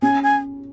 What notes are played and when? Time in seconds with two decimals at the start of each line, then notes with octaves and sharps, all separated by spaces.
0.02 C#4 G#5
0.23 G#5